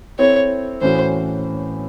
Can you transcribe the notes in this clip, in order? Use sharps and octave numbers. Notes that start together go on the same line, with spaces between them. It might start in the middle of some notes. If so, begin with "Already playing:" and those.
C4 E4 A4 C#5
A2 E3 A3 C#4 F#4 C5